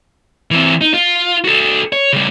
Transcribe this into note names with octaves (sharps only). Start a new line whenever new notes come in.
E3 C4
D#4
F4
F#4 A4
C#5
C#3 G3